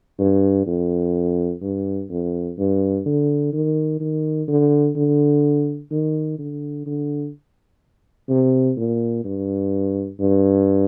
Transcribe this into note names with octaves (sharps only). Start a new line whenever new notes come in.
G2
F2
G2
F2
G2
D3
D#3
D#3
D3
D3
D#3
D3
D3
C3
A#2
G2
G2